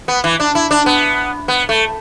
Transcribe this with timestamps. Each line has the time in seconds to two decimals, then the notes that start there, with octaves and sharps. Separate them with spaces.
0.08 B3
0.24 E3
0.40 D4
0.55 E4
0.71 D4
0.86 B3
1.48 B3
1.69 A3